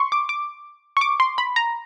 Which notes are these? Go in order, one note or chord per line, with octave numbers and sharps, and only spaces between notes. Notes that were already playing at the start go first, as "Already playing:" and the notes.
Already playing: C6 C#6
D6
D6
C#6
D6
C6
B5
A#5